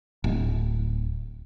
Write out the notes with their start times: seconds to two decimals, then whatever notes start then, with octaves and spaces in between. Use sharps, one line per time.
0.24 D1